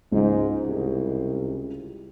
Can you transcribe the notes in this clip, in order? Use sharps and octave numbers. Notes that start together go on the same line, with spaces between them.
C#2 G#2 G#3
C2